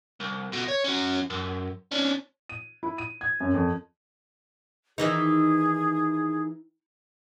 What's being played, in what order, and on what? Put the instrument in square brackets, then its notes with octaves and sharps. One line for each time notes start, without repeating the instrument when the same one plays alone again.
[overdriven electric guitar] C2
D2 B2
C#5
C#4 F#4
F#2
C#4 D4
[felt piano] D#7
E4
D#7
G#6
F#2
F2
[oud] D#3 E3 D#4 [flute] G#4